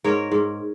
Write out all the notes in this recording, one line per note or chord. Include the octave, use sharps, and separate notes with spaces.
G#2 A#4 C#5
G#2